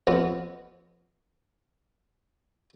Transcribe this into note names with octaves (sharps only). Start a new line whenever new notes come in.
F2 B3